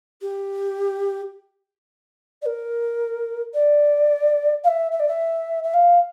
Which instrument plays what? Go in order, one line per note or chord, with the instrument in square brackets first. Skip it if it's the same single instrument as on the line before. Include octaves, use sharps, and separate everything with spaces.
[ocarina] G4
D5
A#4
D5
F5
E5
E5
D5
E5
E5
F5